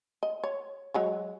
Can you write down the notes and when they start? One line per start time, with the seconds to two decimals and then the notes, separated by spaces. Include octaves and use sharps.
0.23 D#5
0.44 C#5
0.94 F#3 G#3 C#5